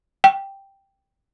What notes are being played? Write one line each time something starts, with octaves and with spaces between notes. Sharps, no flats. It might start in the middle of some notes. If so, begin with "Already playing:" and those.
G5